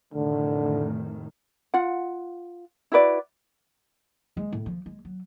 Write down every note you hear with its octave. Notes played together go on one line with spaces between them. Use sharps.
F1 A2 D3 D#3
F4 F#5
E4 F#4 B4 D5
G#3
A2
F3
G#3
F#3